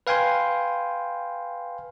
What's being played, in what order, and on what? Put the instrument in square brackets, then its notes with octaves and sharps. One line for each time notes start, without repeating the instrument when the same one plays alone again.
[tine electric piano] B4 F5 G5 G#5 C6